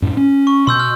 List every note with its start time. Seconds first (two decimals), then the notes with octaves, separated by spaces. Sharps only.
0.02 F#2 A2
0.17 C#4
0.47 C#6
0.67 B2 C6 E6 G6
0.80 F6